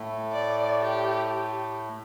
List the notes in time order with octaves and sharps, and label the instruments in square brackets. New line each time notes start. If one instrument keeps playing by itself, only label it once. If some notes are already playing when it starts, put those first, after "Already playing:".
Already playing: [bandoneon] A2 A3
[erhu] D5
G4